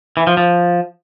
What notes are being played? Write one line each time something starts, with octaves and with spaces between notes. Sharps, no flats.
E3
F3
F3